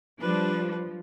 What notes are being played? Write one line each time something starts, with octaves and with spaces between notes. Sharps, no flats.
F3 G3 D4 B4